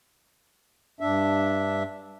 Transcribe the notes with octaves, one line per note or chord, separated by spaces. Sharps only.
G2 D4 E5